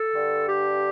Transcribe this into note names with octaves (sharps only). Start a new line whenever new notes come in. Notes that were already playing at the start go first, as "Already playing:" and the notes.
Already playing: A4
G2 D3
G4